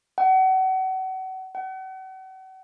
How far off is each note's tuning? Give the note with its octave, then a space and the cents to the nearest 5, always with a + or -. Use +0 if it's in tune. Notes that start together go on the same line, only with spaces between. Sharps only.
F#5 +35
F#5 +40